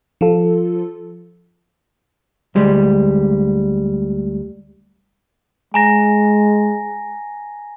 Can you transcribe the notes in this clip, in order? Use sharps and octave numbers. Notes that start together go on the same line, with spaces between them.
F3 F4 A4
D2 G3 G#3
G#3 G#5 A#5 A#6